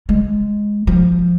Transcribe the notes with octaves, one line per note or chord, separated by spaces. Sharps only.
G#3
F3